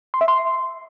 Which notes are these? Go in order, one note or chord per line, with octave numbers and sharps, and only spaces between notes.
C6
E5
C6